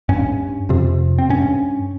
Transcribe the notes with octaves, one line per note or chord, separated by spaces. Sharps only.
G2 C#4
F2 C3
C4
G2 C#4